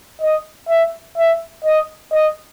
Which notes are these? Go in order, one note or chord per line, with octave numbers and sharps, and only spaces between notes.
D#5
E5
E5
D#5
D#5